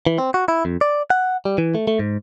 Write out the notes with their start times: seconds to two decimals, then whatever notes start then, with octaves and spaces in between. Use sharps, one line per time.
0.07 E3
0.18 C4
0.34 F#4
0.48 E4
0.65 F2
0.81 D5
1.10 F#5
1.45 G3
1.58 E3
1.75 A3
1.88 A3
1.99 G#2